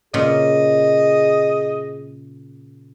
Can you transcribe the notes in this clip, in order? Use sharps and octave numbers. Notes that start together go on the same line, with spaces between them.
A#2 C#3 G#4 D#5